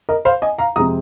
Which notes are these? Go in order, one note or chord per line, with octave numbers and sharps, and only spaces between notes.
A#4 D#5
C5 F5
D#5 G#5
F5 A#5
F2 C3 G#3 C4 A#5 D#6